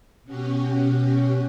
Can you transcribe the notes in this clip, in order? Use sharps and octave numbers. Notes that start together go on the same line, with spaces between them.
B2 C#4 F#4 G4